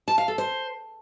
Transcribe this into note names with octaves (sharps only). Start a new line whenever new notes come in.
A5
F5
A4
C5